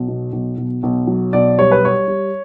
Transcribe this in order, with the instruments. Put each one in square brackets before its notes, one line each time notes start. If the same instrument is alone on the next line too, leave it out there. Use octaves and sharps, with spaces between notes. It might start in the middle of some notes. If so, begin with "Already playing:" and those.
Already playing: [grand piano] B1
B2
B1
B1
B1
F#3
B1 D5
G3 C#5
B4
G3 C#5
G3